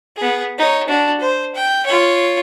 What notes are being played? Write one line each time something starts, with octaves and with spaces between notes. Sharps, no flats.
B3 G#4
D#4 C#5
D4 F#4
C5
G5
F4 C#5